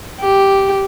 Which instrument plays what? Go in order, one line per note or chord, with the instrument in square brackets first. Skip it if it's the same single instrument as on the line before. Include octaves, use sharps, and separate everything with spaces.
[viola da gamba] G4